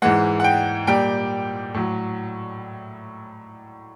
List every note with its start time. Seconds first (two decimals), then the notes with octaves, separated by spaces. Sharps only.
0.02 G#2 E3 G#3 F#5
0.40 F#5
0.44 G5
0.87 A#2 G3 G5
1.74 A2 F#3